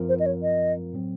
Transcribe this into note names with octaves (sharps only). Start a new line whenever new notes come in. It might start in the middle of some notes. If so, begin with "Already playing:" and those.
Already playing: F#2 F3 C4 F4 A#4
C5
D#5
C#5
D#5
A2 F#3 C4